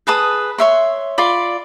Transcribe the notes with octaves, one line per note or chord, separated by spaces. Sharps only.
G#4 B4 A5 D#6
C#5 E5 C6
F4 D5 B5